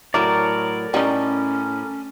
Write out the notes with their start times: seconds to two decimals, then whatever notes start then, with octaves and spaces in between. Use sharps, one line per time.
0.14 A2 F#3 E4 A#4 D5
0.94 A2 G3 C#4 D#4